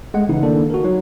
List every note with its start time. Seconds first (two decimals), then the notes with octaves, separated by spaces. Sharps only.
0.14 G#3 A3 F#5
0.29 C#3 E3 D#4 E4
0.43 D#3 A#3 D4 A4
0.70 F#4 A#4
0.84 F#3 D#4